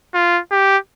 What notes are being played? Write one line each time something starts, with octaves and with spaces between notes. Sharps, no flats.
F4
G4